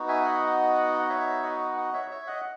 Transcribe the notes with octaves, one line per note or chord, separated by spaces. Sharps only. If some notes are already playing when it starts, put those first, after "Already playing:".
Already playing: B3 D#4 F#4
E5 G#5
D#5 F#5
F#5
C#5 E5
D#5 F#5
D#5 F#5
C#5 E5
C#5 E5
D#5 F#5